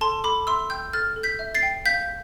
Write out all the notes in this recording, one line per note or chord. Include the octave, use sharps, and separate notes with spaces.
A4 A5 C6
A4 B5 D6
E5 C6 E6
G5 E6 G6
A4 F6 A6
A4
G6 B6
E5
A6 C7
G5
F5 G6 B6